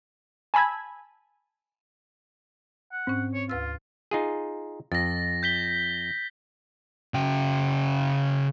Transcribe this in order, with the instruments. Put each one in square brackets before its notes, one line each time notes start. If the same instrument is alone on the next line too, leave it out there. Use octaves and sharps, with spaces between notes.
[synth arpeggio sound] G#5 A5 B5 E6 G#6
[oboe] F#5
[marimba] G#2 C#4 [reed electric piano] C4
[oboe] C#5
[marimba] D2 B4 E6 [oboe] F4
[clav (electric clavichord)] D#4 F4 G#4
[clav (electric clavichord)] F2 [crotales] A6 A#6
[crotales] G6 B6 G7
[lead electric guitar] C#3 G5